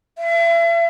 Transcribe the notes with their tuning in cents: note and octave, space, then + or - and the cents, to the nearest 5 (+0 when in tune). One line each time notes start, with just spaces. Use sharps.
E5 +40